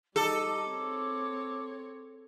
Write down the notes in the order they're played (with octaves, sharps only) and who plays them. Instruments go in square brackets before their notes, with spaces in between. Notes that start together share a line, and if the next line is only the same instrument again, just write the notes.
[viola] G3 D#4 [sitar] A4 [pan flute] D6
[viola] C4 C#5